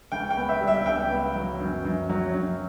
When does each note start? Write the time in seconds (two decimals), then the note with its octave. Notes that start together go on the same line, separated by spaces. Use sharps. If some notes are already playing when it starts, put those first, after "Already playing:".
0.12 C#2 G5
0.30 G5
0.37 B3
0.49 E5
0.61 G3
0.68 E5
0.86 C#2 G5
1.11 B3
1.35 F#3
1.60 F#2
1.85 F#2
2.09 F#3
2.34 F#2